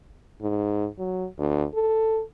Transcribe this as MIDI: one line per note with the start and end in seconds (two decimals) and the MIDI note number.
0.41 0.87 44
0.98 1.27 54
1.38 1.65 38
1.75 2.21 69